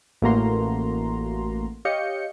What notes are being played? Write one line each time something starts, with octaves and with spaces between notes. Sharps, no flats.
A1 A3 A#3 F#4 A#5 C6
G4 C#5 D#5 F5 G6 C#7